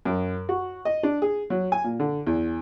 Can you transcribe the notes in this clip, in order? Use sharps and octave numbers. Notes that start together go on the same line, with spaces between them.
F#2
F#4
D#5
D4
G#4
F#3
G#5
A#2
D3
E2